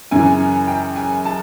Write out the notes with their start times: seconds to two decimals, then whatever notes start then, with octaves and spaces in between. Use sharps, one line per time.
0.11 F#2 C#3 E3 G#5
0.68 G5
0.96 G#5
1.25 A5